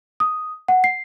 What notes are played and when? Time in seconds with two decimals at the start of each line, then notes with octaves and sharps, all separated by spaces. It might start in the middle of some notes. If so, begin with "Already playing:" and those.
0.20 D#6
0.68 F#5
0.84 C7